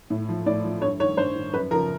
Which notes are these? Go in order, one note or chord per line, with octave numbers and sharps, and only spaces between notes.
A2
F3
A2 D5
F3
G2 C#5
D#3 C#5
G2 C5
D#3
F#2 B4
C#3 F3 A#4